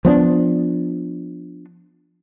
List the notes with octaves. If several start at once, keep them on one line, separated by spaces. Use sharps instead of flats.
F3 B3 C#4 D4